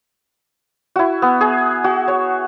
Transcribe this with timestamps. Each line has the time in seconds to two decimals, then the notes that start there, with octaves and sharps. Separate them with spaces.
0.96 E4 F#4
1.22 B3
1.41 G#4
1.84 F#4
2.08 C#5